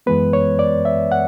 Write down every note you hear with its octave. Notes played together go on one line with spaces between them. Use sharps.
F#2 E3 G#3 B3 B4
C#5
D5
E5
F#5